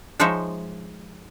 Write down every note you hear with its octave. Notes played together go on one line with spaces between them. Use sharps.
F3 G#3 D#4 C5 C#5 E5